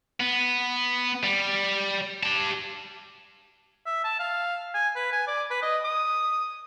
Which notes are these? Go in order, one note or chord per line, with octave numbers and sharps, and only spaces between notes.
B3
G3
G4 A5
E5
A5
F5
G#5
B4
G#5
D5
B4
D#5
D#6